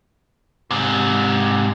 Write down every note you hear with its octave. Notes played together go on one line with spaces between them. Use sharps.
G#2 C3